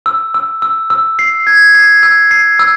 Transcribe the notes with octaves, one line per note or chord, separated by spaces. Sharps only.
E6
E6
E6
E6
C7
G#6
C7
E6
C7
E6